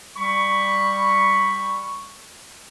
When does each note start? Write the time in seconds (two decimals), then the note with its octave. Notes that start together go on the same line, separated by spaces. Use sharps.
0.17 G3 B5 C#6